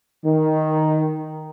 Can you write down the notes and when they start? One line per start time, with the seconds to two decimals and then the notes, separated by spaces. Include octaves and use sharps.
0.25 D#3